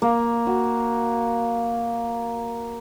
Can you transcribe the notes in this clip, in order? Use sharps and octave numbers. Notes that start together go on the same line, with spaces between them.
A#3
F#4